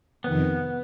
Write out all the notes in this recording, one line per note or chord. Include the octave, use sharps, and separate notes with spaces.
F2 C3 D#3 B3